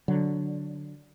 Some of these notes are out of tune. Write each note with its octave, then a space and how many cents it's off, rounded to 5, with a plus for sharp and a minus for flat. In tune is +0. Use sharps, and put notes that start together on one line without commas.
D3 +0 F#3 +0